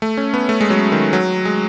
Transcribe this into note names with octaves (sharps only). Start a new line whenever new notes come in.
A3
C#4
B3
A3
G#3
F#3
D#3
F#3
G#3